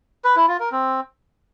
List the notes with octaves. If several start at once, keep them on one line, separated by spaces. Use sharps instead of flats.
B4
E4
F4
A#4
C4